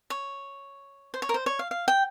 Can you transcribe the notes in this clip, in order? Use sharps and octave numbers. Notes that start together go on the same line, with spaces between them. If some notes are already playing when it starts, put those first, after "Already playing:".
C#5
C5
C#5
A#4
C5
C#5
F5
F5
G5